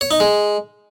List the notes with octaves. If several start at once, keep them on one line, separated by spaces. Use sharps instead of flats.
C#5
D#4
G#3